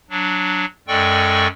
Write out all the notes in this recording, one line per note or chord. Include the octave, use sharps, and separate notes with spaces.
F#3 D4
F#2 G#3 A4 D5 G5 C#6